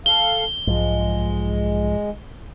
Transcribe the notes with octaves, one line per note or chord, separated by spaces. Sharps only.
A4 F5 G7
B1 G#2 F3 G#3